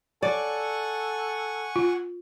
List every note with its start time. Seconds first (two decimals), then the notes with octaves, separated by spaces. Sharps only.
0.23 A4 D5 F#5 G#5 C#6
1.76 F4